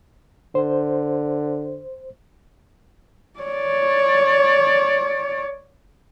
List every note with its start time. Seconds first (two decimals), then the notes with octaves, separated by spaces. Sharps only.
0.55 D3 C5
3.40 C#5 D5